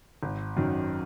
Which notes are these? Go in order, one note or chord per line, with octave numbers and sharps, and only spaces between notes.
G#1
F#2 D#3